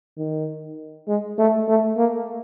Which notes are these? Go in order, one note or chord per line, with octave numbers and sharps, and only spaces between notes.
D#3
G#3
A3
A3
A#3